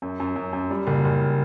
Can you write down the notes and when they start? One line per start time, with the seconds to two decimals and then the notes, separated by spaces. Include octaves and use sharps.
0.02 F#2
0.20 F#2
0.36 F#2
0.53 F#2
0.71 G3
0.87 F#1
1.05 F#1